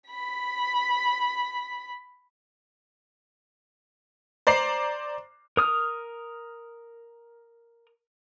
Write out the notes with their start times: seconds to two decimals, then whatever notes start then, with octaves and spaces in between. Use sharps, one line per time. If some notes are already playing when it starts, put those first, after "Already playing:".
0.10 B5 B6
4.47 C5 D5 A#5 C7
5.57 A#4 D#6 F6